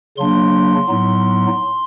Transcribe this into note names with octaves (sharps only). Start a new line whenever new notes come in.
C#3 F#3 A#3 D4 C6
A2 F#3 B3 D#4